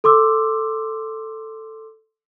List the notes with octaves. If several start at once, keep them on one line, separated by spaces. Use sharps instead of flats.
A4 C6 D6 E6